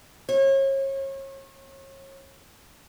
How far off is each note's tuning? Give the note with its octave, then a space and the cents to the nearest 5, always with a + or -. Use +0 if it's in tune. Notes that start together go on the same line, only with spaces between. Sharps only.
C#5 -35